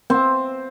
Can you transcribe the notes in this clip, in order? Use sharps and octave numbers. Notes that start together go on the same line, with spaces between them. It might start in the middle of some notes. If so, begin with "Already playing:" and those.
C4